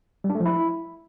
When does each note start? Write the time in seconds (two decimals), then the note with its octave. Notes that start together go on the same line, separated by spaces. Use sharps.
0.24 G3
0.30 D4
0.35 A3
0.40 F3
0.45 E4